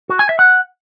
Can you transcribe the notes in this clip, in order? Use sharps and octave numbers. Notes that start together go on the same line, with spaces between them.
F#4
G#5
E5
F#5